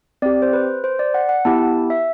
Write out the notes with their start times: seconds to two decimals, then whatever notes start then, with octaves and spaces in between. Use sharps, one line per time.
0.22 C4 D5
0.26 G4
0.42 C5
0.53 B4
0.84 C5
0.99 D5
1.14 F#5
1.29 F#5
1.45 B3 E4 G4 A5
1.90 E5